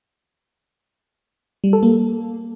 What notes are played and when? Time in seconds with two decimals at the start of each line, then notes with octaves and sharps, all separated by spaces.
1.64 G3
1.73 A4
1.83 A#3